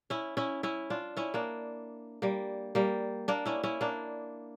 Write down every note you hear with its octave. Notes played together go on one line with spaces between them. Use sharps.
C#4 E4
C#4 E4
C#4 E4
D4 F4
C#4 E4
A#3 D4
G3 A#3
G3 A#3
A#3 D4
C#4 E4
C#4 E4
A#3 D4